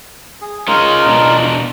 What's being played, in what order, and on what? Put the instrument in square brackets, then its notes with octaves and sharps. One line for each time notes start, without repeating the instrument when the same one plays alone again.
[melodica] G#4
[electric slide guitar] G#3 C#4 [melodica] D#4 F4 A#4
[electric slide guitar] B2 D4